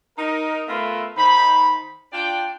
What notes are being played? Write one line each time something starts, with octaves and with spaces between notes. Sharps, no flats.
D#4 A#4
A3 B3 F4 A#4 B4 E5
D#3 D#4 C5 B5
D4 F4 D5 G5